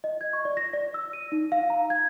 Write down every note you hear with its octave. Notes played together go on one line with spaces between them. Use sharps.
D#5
G#6
C#6
D5
A#6
D5
E6
D#7
D#4
F5
A#5
G#6